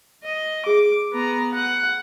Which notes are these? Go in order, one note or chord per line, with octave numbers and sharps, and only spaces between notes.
D#5
G#4 E5 D6
B3 A#5
F#5